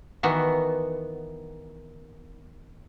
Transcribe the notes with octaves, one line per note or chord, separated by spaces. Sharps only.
D#3 E3 B3 F#4